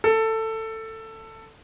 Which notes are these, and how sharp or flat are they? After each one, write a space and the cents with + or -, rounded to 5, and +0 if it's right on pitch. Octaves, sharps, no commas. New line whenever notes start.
A4 +15